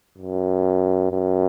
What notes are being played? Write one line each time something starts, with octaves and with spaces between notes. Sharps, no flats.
F#2
F#2